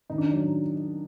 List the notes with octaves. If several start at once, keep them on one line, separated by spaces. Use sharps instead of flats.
D#3 D#4
D4
D#4
F#3